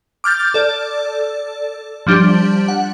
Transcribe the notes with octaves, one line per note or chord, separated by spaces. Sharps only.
D6 F6 G6 A6
A4 D5
F3 G3 D4 G4
F#5